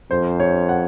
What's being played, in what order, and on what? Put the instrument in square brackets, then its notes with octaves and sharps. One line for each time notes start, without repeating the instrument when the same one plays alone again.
[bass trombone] F2 [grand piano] C5
[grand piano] C#5
F#5